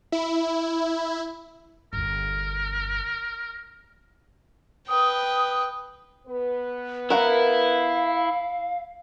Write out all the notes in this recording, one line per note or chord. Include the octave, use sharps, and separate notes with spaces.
E4
G1 E2 A#4
B4 G5 D#6
B3 B4
E4 A#4 F5 F#5